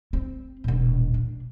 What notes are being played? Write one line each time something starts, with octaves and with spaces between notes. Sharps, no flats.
C4
E1 A#2
D4